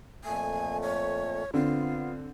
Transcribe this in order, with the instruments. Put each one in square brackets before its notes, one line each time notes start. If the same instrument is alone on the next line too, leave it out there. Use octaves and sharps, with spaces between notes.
[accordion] F2 A#2 A3 [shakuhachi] G#5
[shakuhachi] C#5
[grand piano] D3 C4 [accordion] B3 [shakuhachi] F4